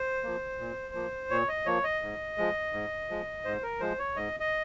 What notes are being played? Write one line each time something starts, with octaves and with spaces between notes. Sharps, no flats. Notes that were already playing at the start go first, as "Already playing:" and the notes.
Already playing: C5
F3 A#3
A#2
F3 A#3
A#2 C#5
D#5
F3 A#3 C#5
D#5
G#2
F3 G#3
G#2
F3 G#3
G#2 C5
A#4
F3 G#3 C5
C#5
G#2 D#5
D#5